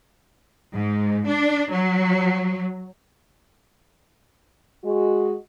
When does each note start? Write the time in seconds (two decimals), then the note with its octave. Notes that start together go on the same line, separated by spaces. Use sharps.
0.74 G#2
1.27 D4
1.70 F#3
4.85 G#3 F#4